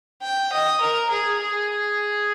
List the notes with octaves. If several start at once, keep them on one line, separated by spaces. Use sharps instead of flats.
G5
D#5
A#4
G#4
G#4